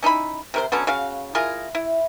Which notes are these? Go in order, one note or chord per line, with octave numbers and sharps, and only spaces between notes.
C#4 D#4 E4 B5
C3 A#4 C5
D3 F#3 B3 C#4
C#3 F#4 F5
E4 F4 G#4 A#4
E4